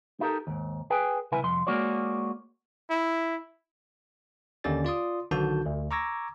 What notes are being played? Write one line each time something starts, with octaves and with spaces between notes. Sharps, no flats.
D#4 E4 G4 A4 A#4
D#2 G#2
G#4 B4 G5 G#5
C2 B2 E4 B4 G#5
C2 F2 C6
G#3 A#3 F#4 C#5 D5
E4
D#2 D3 C#4 G4 D5 A6
F4 D5 C6 D#6
B1 D3 D#3 F#4 A5 G6
D2
A#5 C#6 D6 E6 G#6 A#6